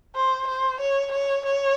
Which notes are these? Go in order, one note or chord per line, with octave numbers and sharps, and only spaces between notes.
C5
C5
C#5
C#5
C#5